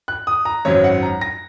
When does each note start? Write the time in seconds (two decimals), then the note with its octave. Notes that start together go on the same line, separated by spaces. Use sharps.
0.08 F#6
0.27 D#6
0.45 A#5
0.65 G#1 F#2 F#3 C#5
0.84 F#5
1.03 A#5
1.21 A#6